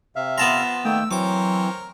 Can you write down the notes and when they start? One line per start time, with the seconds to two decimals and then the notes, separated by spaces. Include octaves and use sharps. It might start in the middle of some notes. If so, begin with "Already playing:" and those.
0.16 C3 E5 F5
0.38 F3 B3 A5 A#5 C6
0.85 D#3 A3 A#3 G5 E6
1.11 E3 F#3 C4 A#4 C5 C#5 D6